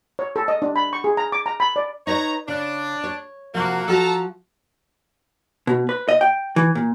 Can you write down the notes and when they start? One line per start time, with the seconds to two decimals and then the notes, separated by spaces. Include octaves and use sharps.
0.19 C#5
0.36 A4
0.48 D#5
0.62 D4
0.76 B5
0.93 C#6
1.04 G#4
1.17 A#5
1.32 D6
1.46 A#5
1.60 B5
1.76 D5
2.07 D#4 B4 C#5 D#5 A#5
2.48 C#3 D4
3.04 C#5
3.55 C3 F3 A#3 F#4
3.88 F3 F#4 A4 A5 A#5
5.67 B2
5.89 B4
6.09 D#5
6.21 G5
6.56 E3
6.75 A#2